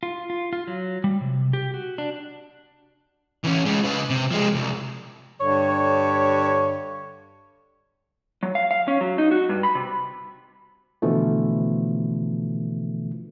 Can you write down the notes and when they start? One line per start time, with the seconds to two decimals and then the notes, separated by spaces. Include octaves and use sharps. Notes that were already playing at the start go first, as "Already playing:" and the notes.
0.03 F4
0.30 F4
0.53 F4
0.67 F#3
1.04 G3
1.21 C3
1.53 G4
1.74 F#4
1.98 D4
3.44 E3 C#4
3.66 G#3 C#4
3.84 C#3 B4
4.09 C3
4.31 F3 G#3
4.54 C2
5.41 G2 D3 C#5
8.43 F#3
8.55 F5
8.71 F5
8.88 C#4
9.01 F#3
9.18 D#4
9.31 F#4
9.49 G2
9.63 B5
9.75 C3
11.02 B2 D3 E3 F3 A3